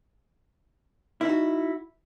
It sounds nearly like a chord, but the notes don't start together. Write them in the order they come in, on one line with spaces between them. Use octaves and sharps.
E4 D#4 F#4